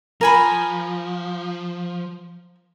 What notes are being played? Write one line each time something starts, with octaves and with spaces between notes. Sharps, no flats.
F3 A#4 G#5 B5